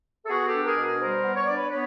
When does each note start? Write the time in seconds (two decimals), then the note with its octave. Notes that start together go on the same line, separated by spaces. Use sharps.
0.25 A4
0.28 B3 F#4 G#4
0.46 G4 A4
0.52 D4
0.64 G#4 A#4
0.76 B2
0.82 G#4 A#4
1.00 G3 A#4 C5
1.24 B3
1.35 C#5
1.45 D4 D5
1.55 B4 C#5
1.70 B3 B4 C#5